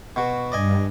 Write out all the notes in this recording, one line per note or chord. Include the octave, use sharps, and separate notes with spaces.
B2 F#4
G2 D5 D#5 G#5